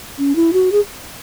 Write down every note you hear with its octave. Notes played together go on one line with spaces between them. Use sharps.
C#4
E4
F#4
G#4